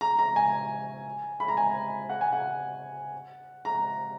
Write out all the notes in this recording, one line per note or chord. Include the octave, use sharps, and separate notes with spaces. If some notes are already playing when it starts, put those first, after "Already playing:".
A#5
A#5
G#5
B5
A#5
G#5
F#5
G#5
F#5
A#5